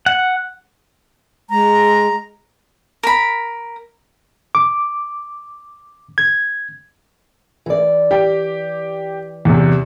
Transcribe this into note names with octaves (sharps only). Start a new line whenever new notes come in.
F#5
G#3 A#5
A#4 B5
D6
G#6
E3 D5
G4 G5
E2 C3